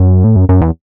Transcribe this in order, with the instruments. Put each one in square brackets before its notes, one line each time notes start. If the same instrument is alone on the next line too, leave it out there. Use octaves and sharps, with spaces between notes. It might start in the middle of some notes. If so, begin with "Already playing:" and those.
Already playing: [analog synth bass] F#2
A2
F#2
F#2
E2